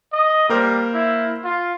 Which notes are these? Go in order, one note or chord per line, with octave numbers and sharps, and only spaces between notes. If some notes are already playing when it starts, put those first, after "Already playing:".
D#5
G3 A#3 A#4 C5
E4
F4